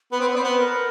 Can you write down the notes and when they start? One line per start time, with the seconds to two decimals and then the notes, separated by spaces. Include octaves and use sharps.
0.12 B3 B4
0.20 C4
0.28 B3
0.35 C4 C5 D5
0.44 B3
0.58 A#4